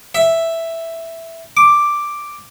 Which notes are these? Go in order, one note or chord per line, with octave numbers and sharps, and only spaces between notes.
E5
D6